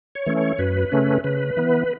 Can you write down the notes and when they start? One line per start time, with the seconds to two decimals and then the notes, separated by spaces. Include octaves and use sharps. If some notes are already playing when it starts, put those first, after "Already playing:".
0.15 C#5
0.26 E3 A3 C#4
0.37 C#5
0.59 F#2 B4
0.92 C#3 A3 C#4
1.24 C#3 B4
1.57 E3 B3